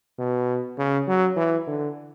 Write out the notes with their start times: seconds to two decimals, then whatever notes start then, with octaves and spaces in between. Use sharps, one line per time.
0.19 B2
0.78 C#3
1.08 F#3
1.37 E3
1.67 D3